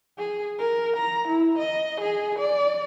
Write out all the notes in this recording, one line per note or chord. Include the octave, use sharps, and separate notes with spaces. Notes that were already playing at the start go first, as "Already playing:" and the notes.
G#4
A#4
A#5
E4
D#5
G#4
D5